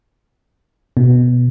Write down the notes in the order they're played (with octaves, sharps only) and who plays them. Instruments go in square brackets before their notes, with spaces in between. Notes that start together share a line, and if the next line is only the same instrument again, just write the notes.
[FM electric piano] B2